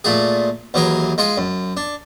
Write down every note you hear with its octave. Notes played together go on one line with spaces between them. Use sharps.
A#2 A3 G#4
D#2 E3 F#3 G#4 A#4
G#3 F4 G#4
F#2
D4